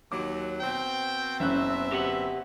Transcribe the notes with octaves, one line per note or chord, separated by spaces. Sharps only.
D#2 F#3 D6
B2 C4 G5
F#1 C#4 E5 F#6
G4 B4 F#5